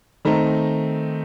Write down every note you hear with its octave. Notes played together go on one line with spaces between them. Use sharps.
D#3 A3 C4 D#4 A#5